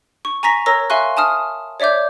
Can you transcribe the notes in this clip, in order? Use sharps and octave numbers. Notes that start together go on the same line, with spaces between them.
C#6
G#5 A#5 C#6 A#6 B6 F7
A#4 C#5 A#5 E6 A#6
E5 F5 G#5 C6 C#6 F#6
G#5 A5 D#6 F6
C#5 D5 E5 D6 G6